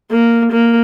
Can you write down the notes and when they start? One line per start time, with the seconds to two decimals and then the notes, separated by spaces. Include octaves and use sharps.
0.11 A#3
0.52 A#3